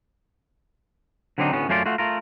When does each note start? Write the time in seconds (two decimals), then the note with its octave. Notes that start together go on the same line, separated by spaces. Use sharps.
1.38 D3 F#3 B3 C4 D4 D#4
1.53 D2 A2 B3 C#4
1.69 F#2 A3 C#4 F4 B4 D5
1.86 A3 F4 F#4
1.98 A3 F4 A#4